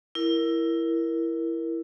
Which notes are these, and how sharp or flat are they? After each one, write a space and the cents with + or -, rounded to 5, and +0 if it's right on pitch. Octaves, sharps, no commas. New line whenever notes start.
E4 +10 A#4 +5